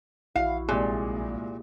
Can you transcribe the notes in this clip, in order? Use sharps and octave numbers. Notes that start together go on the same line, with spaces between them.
A#1 E4 F#4 F5
C2 A#2 G#3 A#3 G#4